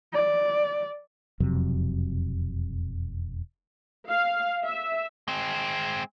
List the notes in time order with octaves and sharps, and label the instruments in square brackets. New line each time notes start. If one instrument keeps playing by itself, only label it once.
[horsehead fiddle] D5
[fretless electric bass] E1 F2 C3 F#3
[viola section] F5
E5
[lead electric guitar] G#3 C4